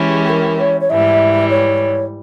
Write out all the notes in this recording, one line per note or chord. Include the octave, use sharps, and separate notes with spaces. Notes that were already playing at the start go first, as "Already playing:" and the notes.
Already playing: E3 G#3 C#4 E4 G4
G#4
G#4
A#4
C#5
C#5
G#2 E3 G3 E5
C#5